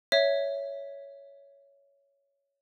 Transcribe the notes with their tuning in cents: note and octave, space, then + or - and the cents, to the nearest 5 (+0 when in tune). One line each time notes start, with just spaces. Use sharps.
C#5 +10 E5 +0